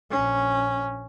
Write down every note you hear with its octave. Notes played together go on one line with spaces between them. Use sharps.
A#1 C#4